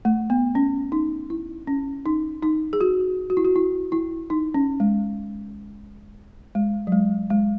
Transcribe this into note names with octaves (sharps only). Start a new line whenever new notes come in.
A3
B3
C#4
D#4
E4
C#4
D#4
D#4
G#4
F#4
F#4
E4
F#4
E4
E4
D#4
C#4
G#3
G#3
F#3
G#3
G#3